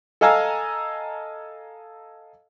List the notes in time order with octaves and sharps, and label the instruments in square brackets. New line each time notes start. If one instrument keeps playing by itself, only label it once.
[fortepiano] A4 D#5 F5 G#5 A#5 E6